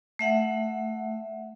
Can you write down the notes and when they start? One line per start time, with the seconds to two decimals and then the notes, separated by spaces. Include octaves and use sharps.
0.19 A3 E5 F#5